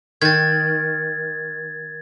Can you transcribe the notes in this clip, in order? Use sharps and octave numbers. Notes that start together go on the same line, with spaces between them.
D#3 G#6 A6